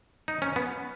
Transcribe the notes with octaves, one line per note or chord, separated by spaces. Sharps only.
D#4
C#4
B3